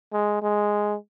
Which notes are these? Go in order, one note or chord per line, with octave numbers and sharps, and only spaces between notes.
G#3
G#3